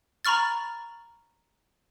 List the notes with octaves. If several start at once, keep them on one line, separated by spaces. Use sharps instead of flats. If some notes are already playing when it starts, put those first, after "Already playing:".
A#5 B5 C#6 F6 A6